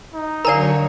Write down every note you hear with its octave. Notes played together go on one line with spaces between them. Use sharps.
D#4
D3 F#3 A#4 C#5 D5 F5 G#5 A#5